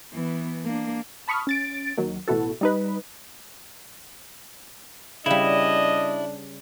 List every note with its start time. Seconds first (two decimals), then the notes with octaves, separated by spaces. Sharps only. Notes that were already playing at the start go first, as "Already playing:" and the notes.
0.14 E3 B3
0.65 A#3 D4
1.28 A5 B5 C#6 D#6 F6
1.47 C#4 A6 D7
1.98 D#2 D#3 F#3
2.28 A1 B2 E4 F#4 A4
2.61 G3 D#4 B4
5.26 C#3 G3 D4 E4 D#5